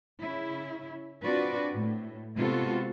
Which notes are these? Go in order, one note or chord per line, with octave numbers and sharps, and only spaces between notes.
C#3 C#4 E4
C4 D4 F4 F#4 B4 D5
A2
C3 G#3 B3 F4 F#4 A4